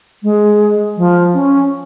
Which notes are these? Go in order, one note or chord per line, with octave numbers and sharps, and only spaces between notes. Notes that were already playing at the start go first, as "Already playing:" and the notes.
G#3
F3
C#4